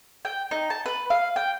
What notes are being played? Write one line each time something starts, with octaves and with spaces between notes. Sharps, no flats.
G5
D#4
A5
B4
F5
G5